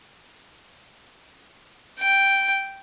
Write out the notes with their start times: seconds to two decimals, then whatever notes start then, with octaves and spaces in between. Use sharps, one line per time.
2.00 G5